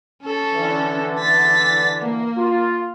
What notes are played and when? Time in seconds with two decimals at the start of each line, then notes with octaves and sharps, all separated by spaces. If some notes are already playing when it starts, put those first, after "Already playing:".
0.23 C#4 A4
0.53 D3 E3
1.19 A6 B6
2.00 A#3
2.36 F4